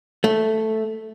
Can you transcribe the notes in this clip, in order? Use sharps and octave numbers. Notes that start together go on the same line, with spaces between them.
A3